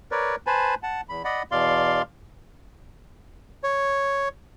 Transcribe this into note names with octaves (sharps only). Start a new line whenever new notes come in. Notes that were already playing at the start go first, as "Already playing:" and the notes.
A#4 B4 C#5 D5
B4 C5 G#5 A5 B5
F#5 A5
E2 B5
D5 D#5 F#5 B5
E2 B2 D5 F5 C6
C#5